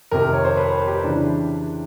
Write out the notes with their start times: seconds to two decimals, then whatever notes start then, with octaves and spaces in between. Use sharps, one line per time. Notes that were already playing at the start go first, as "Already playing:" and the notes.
0.11 F2 C3 D#3 A#4
0.33 C#5
0.45 C5
0.57 B4
0.72 C5
0.87 G4
1.04 C#3 E3 D4